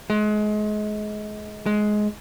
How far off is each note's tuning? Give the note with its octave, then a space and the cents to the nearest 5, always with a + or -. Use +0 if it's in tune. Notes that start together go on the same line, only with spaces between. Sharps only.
G#3 +30
G#3 +15